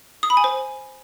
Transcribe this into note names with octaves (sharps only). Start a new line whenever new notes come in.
D#6
B5
G#5
C5